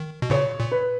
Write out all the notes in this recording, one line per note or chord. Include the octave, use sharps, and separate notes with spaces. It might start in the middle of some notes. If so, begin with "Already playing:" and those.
Already playing: D#3
B2
A#2 C#3 C#5
A#2
B4